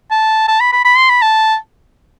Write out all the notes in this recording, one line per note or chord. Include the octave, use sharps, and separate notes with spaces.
A5
A5
B5
B5
B5
C6
B5
A5